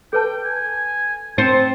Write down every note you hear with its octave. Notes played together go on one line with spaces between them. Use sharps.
A4 B4 G5 A5
G#5
C4 C5 A5 C#7